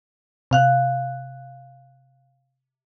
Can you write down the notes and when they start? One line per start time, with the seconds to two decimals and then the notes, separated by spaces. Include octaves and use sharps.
0.51 C3 F5 F#6